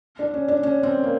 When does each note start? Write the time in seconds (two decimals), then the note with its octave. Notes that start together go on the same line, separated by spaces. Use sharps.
0.19 D4
0.34 C#4
0.48 D4
0.63 C#4
0.83 C4
1.04 A#3